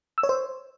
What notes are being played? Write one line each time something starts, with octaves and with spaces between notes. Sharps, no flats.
E6
C#5
C5